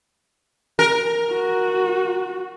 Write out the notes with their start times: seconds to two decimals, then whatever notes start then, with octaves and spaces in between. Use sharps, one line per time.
0.79 A#4
1.32 F#4